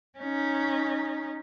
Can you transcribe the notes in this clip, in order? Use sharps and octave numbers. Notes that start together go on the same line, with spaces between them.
C#4 D#4